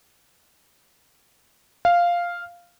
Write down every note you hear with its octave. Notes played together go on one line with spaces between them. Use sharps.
F5